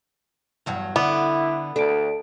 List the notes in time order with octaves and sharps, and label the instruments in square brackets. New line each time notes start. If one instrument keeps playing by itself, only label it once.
[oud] E2 G2 F#3
[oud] D3 [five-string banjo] B3 [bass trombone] E4 [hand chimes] D6
[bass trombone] D2 [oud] D4 [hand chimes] A4 D7